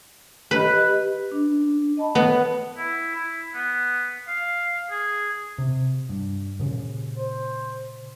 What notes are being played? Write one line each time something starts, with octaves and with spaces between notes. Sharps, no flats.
G4 B4 D#5
D4
D#5 A5 B5
B3
E4
E4
B3
F5
G#4
C3
G2
A#2 C#3
C5